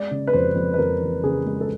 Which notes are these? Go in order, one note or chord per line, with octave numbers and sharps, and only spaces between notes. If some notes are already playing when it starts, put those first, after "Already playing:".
Already playing: G#3 D5
C#3
B4
F2 C5
F2
B4
F2 A#4
E3
C#3 G#4
G#3
A4